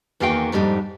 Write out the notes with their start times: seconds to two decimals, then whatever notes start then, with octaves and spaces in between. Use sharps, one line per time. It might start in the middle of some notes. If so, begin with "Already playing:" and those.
0.20 E2 D#3 A#3 F#4 F5 G5
0.52 F2 G#2 G3 C4 D4 D#4